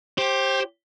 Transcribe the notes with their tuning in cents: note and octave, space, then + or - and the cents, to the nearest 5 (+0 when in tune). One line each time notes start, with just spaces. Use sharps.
G4 +0 C5 +25